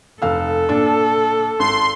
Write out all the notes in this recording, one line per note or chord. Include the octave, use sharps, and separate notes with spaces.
F1 A4 F5 E6
A#2 D4
G#1 C6